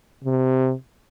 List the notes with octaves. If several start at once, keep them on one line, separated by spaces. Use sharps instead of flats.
C3